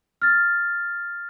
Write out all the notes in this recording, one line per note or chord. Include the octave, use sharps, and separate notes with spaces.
F6 A6